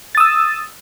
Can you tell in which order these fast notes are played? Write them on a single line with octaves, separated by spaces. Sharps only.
A6 D#6 E6